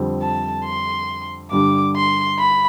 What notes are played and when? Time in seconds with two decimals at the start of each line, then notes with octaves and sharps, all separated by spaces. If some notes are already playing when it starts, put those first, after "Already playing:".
Already playing: F2 D3 G3 C4
0.22 A5
0.65 C6
1.51 G2 D3 G3 D4 D6
1.96 C6
2.38 B5